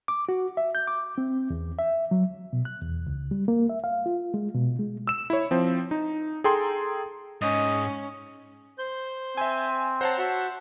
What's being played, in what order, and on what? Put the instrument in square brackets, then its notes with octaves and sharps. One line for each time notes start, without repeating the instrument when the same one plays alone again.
[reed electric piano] D6
F#4
E5
G6
D6
C4
E2
E5
F#3
B2
F#6
E2
C#2
G3
A#3
E5
F5
F4
G#3
B2
G#3
[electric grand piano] E6 E7
E4 C#5
F3 C4
D#4
G#4 A4 G5 A#5 C6
[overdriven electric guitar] G#2 [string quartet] C#4 [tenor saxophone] D#5
[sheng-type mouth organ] C5 G6
[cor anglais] C4 [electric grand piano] E5 G#5
[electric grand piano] C5 C#5 A5 [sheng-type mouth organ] F#5 A#5 C6
[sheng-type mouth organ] F#4 E5 F#5